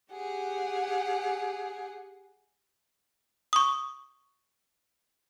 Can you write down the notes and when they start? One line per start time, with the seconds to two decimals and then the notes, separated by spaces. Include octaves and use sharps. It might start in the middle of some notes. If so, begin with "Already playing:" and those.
0.11 G4 G#4 F#5
3.53 C#6 D#6